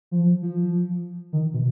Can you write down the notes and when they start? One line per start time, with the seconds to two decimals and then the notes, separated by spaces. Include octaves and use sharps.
0.11 F3
0.42 F3
1.33 D#3
1.54 B2